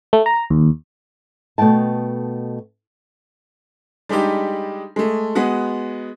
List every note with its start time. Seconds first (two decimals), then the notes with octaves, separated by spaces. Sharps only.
0.13 A3
0.26 A#5
0.50 D#2
1.58 B2 A3 B3 G5 A5
4.09 G3 G#3 D4 D#4 G4
4.96 G#3 A3
5.35 G#3 B3 F#4